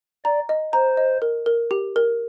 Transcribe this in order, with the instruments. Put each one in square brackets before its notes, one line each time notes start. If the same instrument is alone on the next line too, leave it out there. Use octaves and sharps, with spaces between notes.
[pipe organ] D5 [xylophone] A#5
[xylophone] D#5
[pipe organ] C5 [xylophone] A#5
[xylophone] D#5
A#4
A#4
G4
A#4